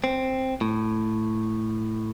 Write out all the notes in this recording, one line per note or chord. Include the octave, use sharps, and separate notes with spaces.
C4
A2